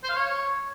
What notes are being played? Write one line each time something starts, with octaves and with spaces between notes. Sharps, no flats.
C5
F5
C#5